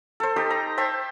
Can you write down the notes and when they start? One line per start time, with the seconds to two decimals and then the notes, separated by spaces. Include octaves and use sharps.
0.20 A4 C5
0.36 D#4 G4 A4
0.50 A#5
0.77 C5 E5 G5 A5